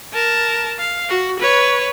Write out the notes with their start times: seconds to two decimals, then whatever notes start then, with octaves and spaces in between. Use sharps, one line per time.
0.14 A#4 A5
0.79 F5
1.09 F#4
1.39 B4 C#5